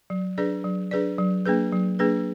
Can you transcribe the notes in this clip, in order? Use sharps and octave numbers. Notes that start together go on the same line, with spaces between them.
F#3
D4 G#4 B4 D5
F#3
D4 G#4 B4 D5
F#3
A#3 D4 G#4 B4
F#3
A#3 D4 G#4 B4